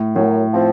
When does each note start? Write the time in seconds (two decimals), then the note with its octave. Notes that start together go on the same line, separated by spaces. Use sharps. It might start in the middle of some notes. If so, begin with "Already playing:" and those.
Already playing: A2
0.15 F#2 A2 F#3
0.54 F3 C4